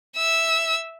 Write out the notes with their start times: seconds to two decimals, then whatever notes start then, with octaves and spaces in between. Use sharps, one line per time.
0.16 E5 E6